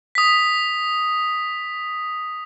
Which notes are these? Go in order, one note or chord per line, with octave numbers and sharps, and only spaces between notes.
D#6 B6